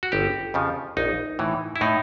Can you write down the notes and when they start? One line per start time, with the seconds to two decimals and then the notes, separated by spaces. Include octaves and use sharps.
0.03 F#4
0.12 G1 G4
0.54 F2 C#3 F3
0.97 A#1 D#4
1.39 A2 E3
1.76 E4
1.81 A2 D#4